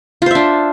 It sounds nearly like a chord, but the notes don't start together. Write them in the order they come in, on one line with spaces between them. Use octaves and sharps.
F4 C5 E5 D4